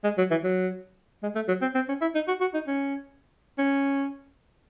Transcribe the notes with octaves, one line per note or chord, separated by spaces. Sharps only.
G#3
F#3
E3
F#3
G#3
A3
F#3
C4
C4
C#4
E4
D#4
F#4
F#4
D#4
C#4
C#4